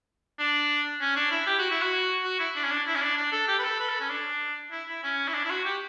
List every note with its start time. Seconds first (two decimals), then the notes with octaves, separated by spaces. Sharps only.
0.39 D4
1.01 C#4
1.17 D4
1.31 E4
1.47 G4
1.59 F#4
1.71 E4
1.82 F#4
2.24 F#4
2.40 E4
2.56 D4
2.64 C#4
2.71 D4
2.87 E4
2.96 C#4
3.02 D4
3.18 D4
3.32 A4
3.48 G4
3.59 B4
3.65 A4
3.80 B4
3.89 A4
4.00 C#4
4.10 D4
4.72 E4
4.89 E4
5.04 C#4
5.28 E4
5.34 D4
5.45 E4
5.50 F#4
5.65 G4